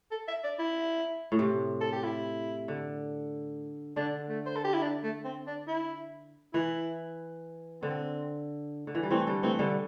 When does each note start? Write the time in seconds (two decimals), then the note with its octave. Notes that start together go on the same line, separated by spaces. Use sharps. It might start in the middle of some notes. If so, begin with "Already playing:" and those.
0.11 A4
0.28 E5
0.44 D5
0.59 E4
1.32 A2
1.39 C3
1.81 A4
1.92 G4
2.04 E4
2.68 D3
3.96 D3 D4
4.29 A3
4.46 C5
4.55 A4
4.64 G4
4.74 E4
4.82 D4
5.03 A3
5.24 C4
5.47 D4
5.68 E4
6.54 E3 E4
7.82 D3 C4
8.87 D3
8.95 E3
9.03 G3
9.11 E3 A3 C4
9.27 D3 G3
9.43 E3 A3 C4
9.59 D3 G3